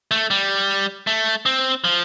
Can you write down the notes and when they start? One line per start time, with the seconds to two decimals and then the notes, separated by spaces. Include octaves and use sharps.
0.11 A3
0.31 G3
1.07 A3
1.46 C4
1.84 F3